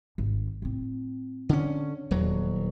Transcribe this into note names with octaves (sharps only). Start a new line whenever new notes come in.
G#1
A2 C4
D3 C#4
D#1 E2 F#3